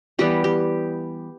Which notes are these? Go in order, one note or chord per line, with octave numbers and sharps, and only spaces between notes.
E3 G3 B3 G4
G4